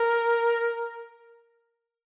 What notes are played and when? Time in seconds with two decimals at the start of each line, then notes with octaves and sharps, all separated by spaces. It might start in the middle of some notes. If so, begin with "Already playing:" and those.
Already playing: A#4